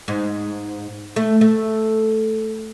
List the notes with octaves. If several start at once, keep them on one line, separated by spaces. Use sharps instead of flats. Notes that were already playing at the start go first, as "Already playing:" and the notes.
G#2
A3
A3